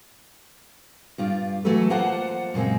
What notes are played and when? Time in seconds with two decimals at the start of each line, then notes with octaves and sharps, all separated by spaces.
1.18 G2 F4 D5
1.65 E3 F#3 A3 F#4 A4 B4
1.90 A#3 F4 C5 F#5 A5
2.54 F#2 A#2 C#3 G#3 C4